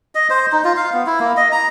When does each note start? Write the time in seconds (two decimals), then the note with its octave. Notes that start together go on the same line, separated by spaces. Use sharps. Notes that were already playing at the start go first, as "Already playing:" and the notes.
0.15 D#5
0.30 C5
0.52 D#4
0.64 F4
0.77 F5
0.93 B3
1.06 E4
1.20 A#3
1.37 D#5
1.52 A#5